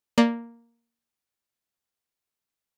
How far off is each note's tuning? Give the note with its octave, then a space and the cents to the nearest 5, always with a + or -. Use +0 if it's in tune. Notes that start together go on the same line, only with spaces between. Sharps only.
A#3 +0 D5 +0